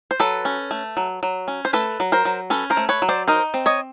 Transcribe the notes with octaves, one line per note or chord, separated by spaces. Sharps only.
C5
F#3 A4 B4
C#4
A3
F#3
F#3
C#4
C5
A3 A4 B4
F#3
A#4 C5
F#3
C#4 A4 B4
A#4 C5
A3
B4 C#5
F#3
C5 D5
D#4 A#4 C5
C4
C#5 D#5